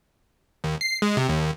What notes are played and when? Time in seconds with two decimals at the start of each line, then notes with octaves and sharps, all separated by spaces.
0.64 D#2
0.81 C7
1.02 G#3
1.17 C3
1.29 D#2